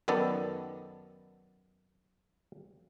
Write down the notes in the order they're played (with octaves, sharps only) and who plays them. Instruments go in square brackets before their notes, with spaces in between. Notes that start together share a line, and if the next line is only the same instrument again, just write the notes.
[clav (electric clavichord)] F#2 D#3 B3 A4 D5